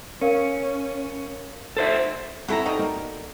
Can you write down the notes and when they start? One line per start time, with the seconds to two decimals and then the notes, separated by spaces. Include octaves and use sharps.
0.21 C#4 A#4 F5
1.77 A4 C5 E5
2.48 F#3 C4 E4 A4 A#5
2.66 G3 D#4 F#4
2.79 A#3